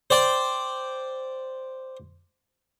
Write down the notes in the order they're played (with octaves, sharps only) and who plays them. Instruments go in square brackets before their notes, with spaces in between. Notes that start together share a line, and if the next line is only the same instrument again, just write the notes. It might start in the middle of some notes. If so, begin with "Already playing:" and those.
[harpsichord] C5 D5 G5